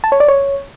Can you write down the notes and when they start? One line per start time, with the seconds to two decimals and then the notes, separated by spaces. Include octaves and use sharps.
0.04 A5
0.12 C#5
0.20 D5
0.28 C#5